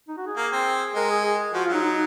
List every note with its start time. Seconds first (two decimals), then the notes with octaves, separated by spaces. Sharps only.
0.08 D#4
0.17 F#4
0.27 G#4
0.37 A#3
0.52 C4
0.95 G#3 A#4
1.10 G#4
1.25 G#4
1.54 F3 F#4
1.64 F4
1.69 F#3 D#4
1.84 D#4